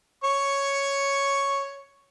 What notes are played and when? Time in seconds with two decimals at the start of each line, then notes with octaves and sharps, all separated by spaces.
0.24 C#5 C#6